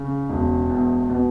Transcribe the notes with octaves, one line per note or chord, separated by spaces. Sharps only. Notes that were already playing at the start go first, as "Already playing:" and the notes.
Already playing: C#3
E1
E2
B2